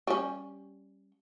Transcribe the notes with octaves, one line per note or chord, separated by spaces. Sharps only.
G3 C#4